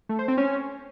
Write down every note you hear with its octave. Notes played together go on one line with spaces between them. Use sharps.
A3
C5
C4
C#4